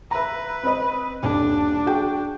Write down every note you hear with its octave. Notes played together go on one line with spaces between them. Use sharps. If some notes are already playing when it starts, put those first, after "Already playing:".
B4 E5 A#5
C4 D#5
D#1 D4
F#4 G#4 G5